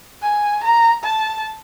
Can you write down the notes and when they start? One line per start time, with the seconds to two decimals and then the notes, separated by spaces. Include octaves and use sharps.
0.22 G#5
0.64 A#5
1.04 A5